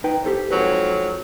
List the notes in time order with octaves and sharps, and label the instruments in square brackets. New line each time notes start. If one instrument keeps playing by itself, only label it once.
[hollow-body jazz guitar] D#4 B4 G5
G4 A4 C5
[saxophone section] F2 G#2 F#3 [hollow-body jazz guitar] B4